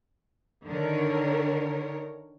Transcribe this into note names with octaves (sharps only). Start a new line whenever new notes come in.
D3 D#3 A#4 C#5